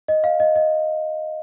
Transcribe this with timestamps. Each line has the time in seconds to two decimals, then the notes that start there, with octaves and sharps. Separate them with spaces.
0.08 D#5
0.24 F5
0.40 D#5
0.56 D#5